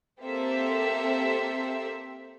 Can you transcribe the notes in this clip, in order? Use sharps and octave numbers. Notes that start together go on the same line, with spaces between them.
A#3 C4 G4 A4 C5 E5